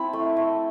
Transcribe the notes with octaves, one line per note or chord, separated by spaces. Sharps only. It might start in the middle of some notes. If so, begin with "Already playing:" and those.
Already playing: C4 E4 A5 B5
A3
A3